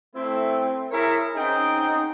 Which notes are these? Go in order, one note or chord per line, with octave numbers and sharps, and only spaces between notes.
A3 C4 E4
E4 G#4 A#4 C#5 E5
C4 C#4 D#4 G#4 F#5 G5